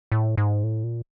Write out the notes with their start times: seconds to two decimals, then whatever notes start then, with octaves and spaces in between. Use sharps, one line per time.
0.12 A2
0.37 G#2
0.64 A2
0.84 A#2